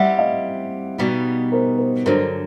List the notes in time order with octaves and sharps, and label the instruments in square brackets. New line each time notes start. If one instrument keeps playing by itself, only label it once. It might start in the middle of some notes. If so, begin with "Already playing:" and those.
Already playing: [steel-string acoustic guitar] G3 C4 E4 G4 [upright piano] E5 F#5
[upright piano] D#5 F5
[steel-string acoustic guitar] B2 G3 B3 D#4 G4
[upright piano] A#4 C5
A#4 C5
[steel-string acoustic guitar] G2 D3 F#3 [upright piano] A#4 C5